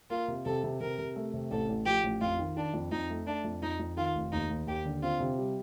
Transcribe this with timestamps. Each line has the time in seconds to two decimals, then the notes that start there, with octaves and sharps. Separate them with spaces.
0.10 A#3 F4
0.28 C3
0.45 C3 A4
0.64 C3
0.81 C3 A#4
0.98 C3
1.16 A3
1.34 C3
1.51 A1 A4
1.69 A1
1.86 F3 G4
2.04 A1
2.21 F2 F4
2.39 D#3
2.56 D#3 D4
2.74 F2
2.92 F2 D#4
3.10 A3
3.27 A3 D4
3.45 F2
3.62 F2 D#4
3.79 F2
3.97 D#3 F4
4.15 F1
4.32 D#2 D#4
4.50 D#2
4.67 D#2 G4
4.85 D3
5.02 C4 F4
5.20 C3
5.38 G3